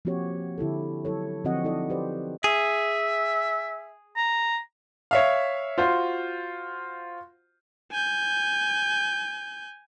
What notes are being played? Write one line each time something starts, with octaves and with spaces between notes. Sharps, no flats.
F3 A#3 C4 F#4 G4 C#5
D3 E4 G4 A4
F#3 E4 A4 C#5
D3 F3 C4 F#4 D#5 F#5
D#4 E4 A4 D5 D#5
G4 B4 C5 D5
G#4 E5
A#5
C#5 E5 F5
F4 F#4 C5
G#5 G6